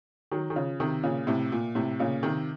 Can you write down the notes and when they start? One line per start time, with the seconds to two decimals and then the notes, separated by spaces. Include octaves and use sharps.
0.32 D#3 F#3
0.50 D#3
0.55 C#3 F3
0.80 C3 D#3
1.03 A#2 C#3
1.27 A2 C3
1.52 A#2
1.75 A2 C3
1.99 A#2 C#3
2.23 C3 D#3